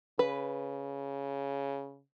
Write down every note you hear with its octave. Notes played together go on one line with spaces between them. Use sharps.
C#3 B4